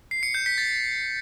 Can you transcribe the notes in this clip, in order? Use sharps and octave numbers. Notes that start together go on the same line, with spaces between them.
C7
C#7
G6
B6
A6